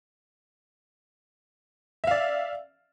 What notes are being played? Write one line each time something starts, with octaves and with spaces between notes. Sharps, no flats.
D5 E5 F5